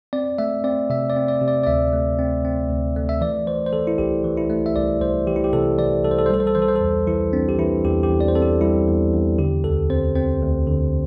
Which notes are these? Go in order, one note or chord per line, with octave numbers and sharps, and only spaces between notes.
C4 D5
A3 E5
C4 D5
C3 E5
D5
C4
D5
C3
D5
D5
D2 E5
A3
C4
C4
D2
A3
E5
E3 D5
E3 C5
C5
E3 A4
E4
C2 G4
E3
E4
A3
E5
C2 D5
C2 C5
E3 G4
E4
G4
C3 A4
E3 D5
C2 A4
C5
A4
C5
G3 A4
C5
A4
E3 C5
A4
C5
A4
E2
E3 E4
C4 D4
G4
E3 E4
E2 G4
G4
E2
D5
C5
C4 A4
G4
G3 E4
E2
E2
D3 G4
D2 A4
C4 C5
C4 C5
D2
D3